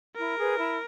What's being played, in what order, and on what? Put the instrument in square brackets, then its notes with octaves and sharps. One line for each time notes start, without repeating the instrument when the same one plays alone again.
[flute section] E4 [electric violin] A#4
[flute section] G#4 B4
E4